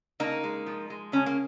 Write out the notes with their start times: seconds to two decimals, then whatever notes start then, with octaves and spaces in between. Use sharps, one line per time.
0.20 C#3 A#3 D#4
0.44 G#3
0.66 F3
0.90 G#3
1.12 C#3 C#4
1.26 A#3